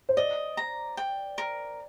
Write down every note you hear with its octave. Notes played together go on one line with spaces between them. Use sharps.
C5
D5 D#5
A#5
G5
A#4